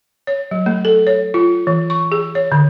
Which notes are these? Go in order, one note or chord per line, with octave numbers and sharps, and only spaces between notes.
C#5
F#3
A3
A4
C#5
F4
E3
C#6
G#4
C#5
D3